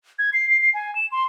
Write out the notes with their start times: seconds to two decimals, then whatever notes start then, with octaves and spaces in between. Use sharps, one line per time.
0.19 G#6
0.33 C7
0.50 C7
0.62 C7
0.74 G#5
0.95 E7
1.12 C6